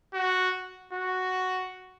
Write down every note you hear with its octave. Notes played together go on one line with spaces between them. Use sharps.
F#4
F#4